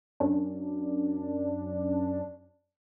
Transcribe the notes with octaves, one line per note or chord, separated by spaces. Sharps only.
F#2 C#4 D4